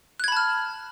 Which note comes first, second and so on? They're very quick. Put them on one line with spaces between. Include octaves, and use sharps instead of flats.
F#6 G#6 B5 A5 F6